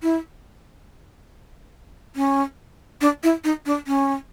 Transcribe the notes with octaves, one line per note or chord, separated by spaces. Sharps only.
E4
C#4
D4
E4
D#4
D4
C#4